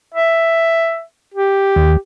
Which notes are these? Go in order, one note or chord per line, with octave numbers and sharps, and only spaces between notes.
E5
G4
D#2